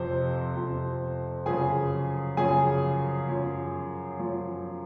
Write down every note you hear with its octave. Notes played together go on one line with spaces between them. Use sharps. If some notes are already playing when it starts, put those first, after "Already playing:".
Already playing: F2 C3 F3 C5
F2 C3 F3
F#2 C#3 F3 G#4 G#5
F#2 C#3 F3 G#4 G#5
F#2 F3
F#2 F3